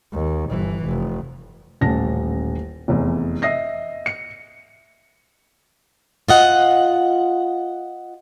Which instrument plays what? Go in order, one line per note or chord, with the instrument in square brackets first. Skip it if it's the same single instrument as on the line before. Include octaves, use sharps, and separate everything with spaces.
[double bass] D#2
G1 E3
F1
[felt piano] D#1 A1 A5 A#6
F1 E2
D#5 E5 D#6 A#6 C7
C#7
[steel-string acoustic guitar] F4 D#5 F#5